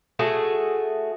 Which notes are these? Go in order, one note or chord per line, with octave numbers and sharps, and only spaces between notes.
A3 F#4 G#4